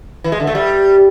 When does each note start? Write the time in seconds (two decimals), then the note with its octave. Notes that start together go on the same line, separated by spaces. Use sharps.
0.24 E3
0.32 G#3
0.40 D3
0.47 A3
0.55 G3